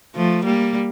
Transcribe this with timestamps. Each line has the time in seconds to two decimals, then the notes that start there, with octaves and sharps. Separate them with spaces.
0.15 F3 A3
0.45 G3 A#3